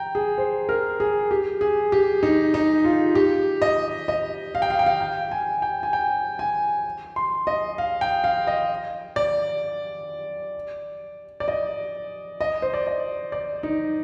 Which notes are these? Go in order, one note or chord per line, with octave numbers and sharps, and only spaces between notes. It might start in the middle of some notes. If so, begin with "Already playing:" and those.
Already playing: G5 A#5
G#4
C5
A#4
G#4
G4
G#4
G4
D#4
D#4
F4
G4
D#5
D#5
F5
G5
F5
G5
F5
G5
G#5
G5
G#5
G5
G#5
C6
D#5
F5
G5
F5
D#5
D5
D5
D#5
D#5
C5
D5
D#5
D5
D#4